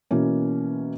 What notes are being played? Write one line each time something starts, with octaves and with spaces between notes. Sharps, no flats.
B2 E3 A#3 C#4